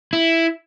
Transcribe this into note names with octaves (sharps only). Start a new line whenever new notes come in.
E4